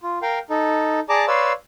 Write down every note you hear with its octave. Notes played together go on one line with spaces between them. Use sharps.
F4
A#4 F5 G5
D#4 A4
G#4 D5 A5 A#5 D6
B4 C#5 D5 F5 C6 E6